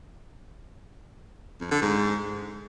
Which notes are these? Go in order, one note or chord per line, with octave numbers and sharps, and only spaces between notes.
F2
D3
G#2